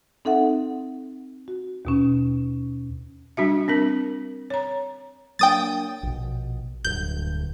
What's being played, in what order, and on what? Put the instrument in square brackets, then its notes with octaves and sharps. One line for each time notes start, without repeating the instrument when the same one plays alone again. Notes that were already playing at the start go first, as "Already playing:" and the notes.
[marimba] C4 D#4 A4 E5 F#5
F#4
D#2 B2 C#4
[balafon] G3 D4 F#4 E5
C4 D4 A#4
C#5 A#5
[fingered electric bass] F#3 A#3 D4 [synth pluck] G5 D#6 A6
[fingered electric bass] A#1 B2
[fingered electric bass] D1 D2 G2 [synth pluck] G6